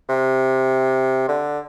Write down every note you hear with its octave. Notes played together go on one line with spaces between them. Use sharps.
C3
D3